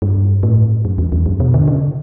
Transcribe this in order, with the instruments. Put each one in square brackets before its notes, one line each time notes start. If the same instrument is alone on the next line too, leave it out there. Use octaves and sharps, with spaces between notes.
[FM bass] G2
A2
F#2
E2
E2
F#2
B2
D3
C#3